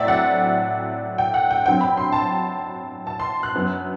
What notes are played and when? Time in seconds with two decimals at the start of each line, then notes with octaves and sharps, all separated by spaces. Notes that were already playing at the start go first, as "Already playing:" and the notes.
Already playing: A2 F#3 A3 C4 D5 E5
0.08 F#5
1.18 G5
1.34 F#5
1.50 G5
1.66 G2 F#3 C4 G5
1.81 B5
1.97 C6
2.12 A5
3.07 A5
3.20 C6
3.43 F#6
3.55 F#2 F#3 B3